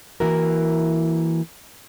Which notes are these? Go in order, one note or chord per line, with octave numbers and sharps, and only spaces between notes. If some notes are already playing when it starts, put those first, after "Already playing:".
E3 A#3 E4 F#4 A#4